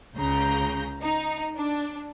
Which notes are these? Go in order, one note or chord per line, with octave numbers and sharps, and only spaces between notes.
C#2 C#3 A#5 G6
D#4
D4